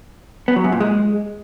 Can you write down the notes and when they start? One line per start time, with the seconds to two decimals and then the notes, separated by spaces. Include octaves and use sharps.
0.48 B3
0.56 F#3
0.64 F#2
0.72 A#2
0.80 G#3